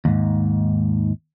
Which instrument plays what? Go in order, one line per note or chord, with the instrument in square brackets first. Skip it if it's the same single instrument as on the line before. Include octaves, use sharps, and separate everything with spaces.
[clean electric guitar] D#2 G#2